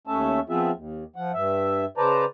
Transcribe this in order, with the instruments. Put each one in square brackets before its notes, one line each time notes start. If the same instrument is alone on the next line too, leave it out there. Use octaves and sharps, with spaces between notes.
[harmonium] D#2 A3 C#4 E5 A5
F3 B3 C4 F4 G#4 E5
D#2
F3 F#5
G2 E5
C#3 B4 C5 D5 A5 A#5